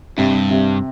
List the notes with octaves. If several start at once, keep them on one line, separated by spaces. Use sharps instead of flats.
G2 C3
C3